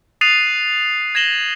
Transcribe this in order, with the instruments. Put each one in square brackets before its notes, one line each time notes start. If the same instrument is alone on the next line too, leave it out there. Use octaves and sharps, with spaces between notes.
[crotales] D#6 F#6 A6 C7 D#7 F7
G#6 A#6 E7 F#7 G7